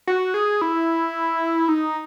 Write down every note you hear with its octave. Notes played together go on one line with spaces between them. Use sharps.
F#4
G#4
E4
D#4